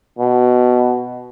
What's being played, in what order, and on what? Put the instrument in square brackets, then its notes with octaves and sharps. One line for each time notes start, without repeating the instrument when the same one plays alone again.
[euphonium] B2